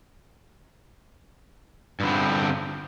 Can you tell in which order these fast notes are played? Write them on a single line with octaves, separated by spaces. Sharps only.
G2 D3 C4